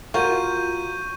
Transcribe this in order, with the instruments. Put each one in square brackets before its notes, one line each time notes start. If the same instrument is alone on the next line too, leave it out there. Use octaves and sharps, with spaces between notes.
[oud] F4 [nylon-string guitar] F#4 A#4 [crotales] C#6 G6 D#7